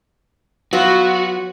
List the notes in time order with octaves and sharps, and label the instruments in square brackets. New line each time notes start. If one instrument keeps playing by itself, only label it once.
[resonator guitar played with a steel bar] F#3 B3 F4 [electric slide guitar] F#4